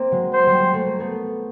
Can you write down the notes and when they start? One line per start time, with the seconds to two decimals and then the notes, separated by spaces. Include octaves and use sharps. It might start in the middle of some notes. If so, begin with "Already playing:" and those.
Already playing: A#3 C4
0.12 F#3 G#3
0.33 C5
0.47 G3
0.60 G#3
0.73 A3
0.86 A#3
1.00 A3 B3